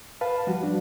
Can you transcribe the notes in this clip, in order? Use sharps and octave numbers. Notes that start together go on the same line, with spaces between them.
B4 F5 A5
F3 G3 F#4
D4